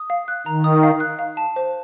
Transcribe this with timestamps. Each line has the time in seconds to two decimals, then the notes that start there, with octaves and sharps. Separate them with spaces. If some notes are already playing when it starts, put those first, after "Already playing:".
Already playing: D#6
0.10 F5
0.28 F#6
0.46 D#3 A#5
0.64 D#6
0.83 F5
1.00 F#6
1.19 F5
1.37 A5
1.56 C5